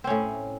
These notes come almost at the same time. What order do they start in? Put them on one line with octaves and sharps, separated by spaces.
C4 C#4 A2